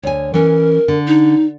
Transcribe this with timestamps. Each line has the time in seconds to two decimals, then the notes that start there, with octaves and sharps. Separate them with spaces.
0.03 D2 C#5 G#5
0.34 E3 C#4 A#4
0.88 D3
1.07 D#4